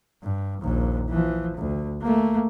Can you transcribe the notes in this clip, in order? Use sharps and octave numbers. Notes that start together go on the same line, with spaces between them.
G2
A#1 D#2
E3 F3
D2
A3 A#3